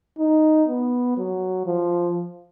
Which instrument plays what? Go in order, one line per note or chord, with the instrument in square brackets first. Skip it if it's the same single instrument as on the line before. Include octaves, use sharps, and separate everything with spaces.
[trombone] D#4
B3
F#3
F3